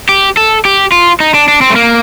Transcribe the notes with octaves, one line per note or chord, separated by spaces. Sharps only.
G4
A4
G4
F4
D#4
D4
D4
C4
A3
A#3